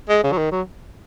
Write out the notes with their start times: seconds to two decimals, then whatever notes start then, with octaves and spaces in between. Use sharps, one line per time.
0.09 G#3
0.24 C#3
0.32 F#3
0.37 D#3
0.51 F#3